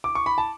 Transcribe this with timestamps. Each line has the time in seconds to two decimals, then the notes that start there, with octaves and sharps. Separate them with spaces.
0.04 D6
0.15 C#6
0.26 B5
0.38 A5